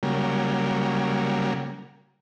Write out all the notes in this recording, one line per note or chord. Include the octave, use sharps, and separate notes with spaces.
C#3 F#3 G3 A#3